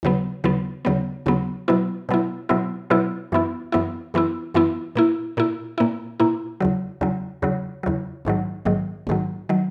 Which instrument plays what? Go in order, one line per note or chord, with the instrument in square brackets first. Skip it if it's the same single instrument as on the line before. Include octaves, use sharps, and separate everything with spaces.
[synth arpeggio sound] D#2 C#3 F#3 B3
D#2 C#3 F#3 B3
D#2 C#3 F#3 B3
D#2 C#3 F#3 B3
B2 F#3 B3 E4
B2 F#3 B3 E4
B2 F#3 B3 E4
B2 F#3 B3 E4
F#2 E3 B3 E4
F#2 E3 B3 E4
F#2 E3 B3 E4
F#2 E3 B3 E4
A#2 A#3 E4
A#2 A#3 E4
A#2 A#3 E4
A#2 A#3 E4
E2 C#3 F#3
E2 C#3 F#3
E2 C#3 F#3
E2 C#3 F#3
A#1 G#2 D#3 F#3
A#1 G#2 D#3 F#3
A#1 G#2 D#3 F#3
D#3 F#3